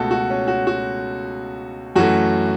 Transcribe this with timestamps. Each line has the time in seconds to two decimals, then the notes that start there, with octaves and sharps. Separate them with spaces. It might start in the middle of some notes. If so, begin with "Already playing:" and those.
Already playing: C#2 B2 A3 F#4 A4
0.11 F#4
0.30 C#4
0.48 F#4
0.67 F#4
1.96 F#2 E3 A3 F#4